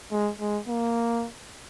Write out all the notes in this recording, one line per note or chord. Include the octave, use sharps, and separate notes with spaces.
G#3
G#3
A#3